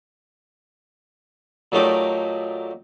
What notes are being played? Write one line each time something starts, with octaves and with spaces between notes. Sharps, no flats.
A#2 F#3 A3 D#4 G4